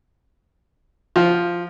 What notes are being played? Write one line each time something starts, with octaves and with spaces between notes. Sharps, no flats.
F3